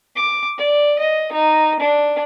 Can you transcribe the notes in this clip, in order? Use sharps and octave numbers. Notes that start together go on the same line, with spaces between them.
D6
D5
D#5
D#4
D4